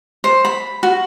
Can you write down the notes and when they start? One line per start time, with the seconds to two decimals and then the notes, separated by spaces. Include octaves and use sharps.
0.24 C5
0.45 B5
0.83 F#4